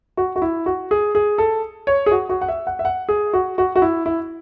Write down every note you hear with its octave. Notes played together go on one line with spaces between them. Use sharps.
F#4
F#4
E4
F#4
G#4
G#4
A4
C#5
G#4
F#4
F#4
F#5
E5
F#5
E5
F#5
G#4
F#4
F#4
F#4
E4
E4